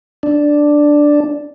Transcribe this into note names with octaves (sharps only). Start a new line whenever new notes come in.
D4